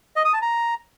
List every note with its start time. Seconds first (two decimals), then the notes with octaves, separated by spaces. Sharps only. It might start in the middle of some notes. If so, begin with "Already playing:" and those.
0.16 D#5
0.25 D#6
0.33 A5
0.42 A#5